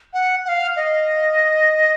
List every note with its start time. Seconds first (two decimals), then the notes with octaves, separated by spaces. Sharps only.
0.13 F#5
0.45 F#5
0.49 F5
0.76 D#5